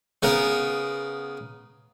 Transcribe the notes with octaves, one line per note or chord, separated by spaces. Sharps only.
C#3 B3 A#4